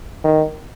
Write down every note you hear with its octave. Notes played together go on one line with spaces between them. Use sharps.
D#3